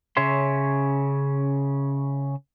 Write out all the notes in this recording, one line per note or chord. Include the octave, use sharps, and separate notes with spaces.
C#3 C#4 C#5 E5 C6